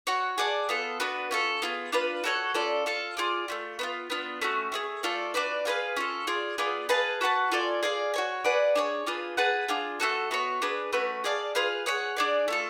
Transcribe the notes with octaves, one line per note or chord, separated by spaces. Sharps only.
F#4 C#5 F#5
G#4 D5 F#5 A5
B3 F4 A4
B3 D4 F#4 B4
C#4 F4 A4
B3 F4 G#4
D4 F4 B4
F#4 A4 C#5 F#5
C#4 F4 A4 D5
F4 A4 F5
F4 G#4 D5
A3 C#4 F4
B3 D4 F4
B3 D4 F4
A3 C#4 F#4
A3 D4 G#4
A3 F4 A4 D5
D4 F#4 B4 D5
F4 G#4 B4 F5
C#4 F4 A4
F4 G#4 D5
B3 F4 G#4 D5
G#4 B4 F5 A5
F#4 B4 F#5 A5
F4 A4 D5 G#5
G#4 D5 F5
F#4 C#5 G#5
G#4 B4 D5 F#5
D4 G#4 C#5
D4 F4 G#4 B4
G#4 B4 F#5 A5
D4 F4 G#4
A3 D4 F#4 A4
B3 F#4 C#5
D4 G#4 B4
A3 C#4 F#4 B4
G#4 D5 F5 A5
F4 G#4 B4 F5
G#4 C#5 F#5
D4 G#4 D5
A3 F4 A4